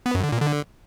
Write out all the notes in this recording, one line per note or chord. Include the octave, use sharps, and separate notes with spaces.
B3
F#2
D3
A#2
D3